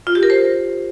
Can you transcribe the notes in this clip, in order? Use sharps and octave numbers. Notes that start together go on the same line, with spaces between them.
F4
G4
A#4
C5